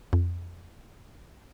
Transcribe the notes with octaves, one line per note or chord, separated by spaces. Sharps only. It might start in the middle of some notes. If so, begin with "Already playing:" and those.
F2